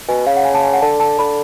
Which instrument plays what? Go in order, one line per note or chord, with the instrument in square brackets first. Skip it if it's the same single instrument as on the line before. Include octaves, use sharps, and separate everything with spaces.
[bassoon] B2 [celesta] G#5
[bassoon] C#3 [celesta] F5
[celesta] F#5
G#5
A5
G#5
F#5
[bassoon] D3 [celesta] A5
[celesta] A5
[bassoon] D3 [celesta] B5